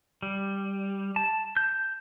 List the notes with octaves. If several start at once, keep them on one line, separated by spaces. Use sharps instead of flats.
G3
A5
G6